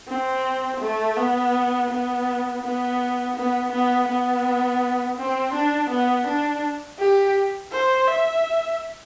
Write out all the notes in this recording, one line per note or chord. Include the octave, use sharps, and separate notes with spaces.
C4
A3
B3
B3
B3
B3
B3
B3
C4
D4
B3
D4
G4
C5
E5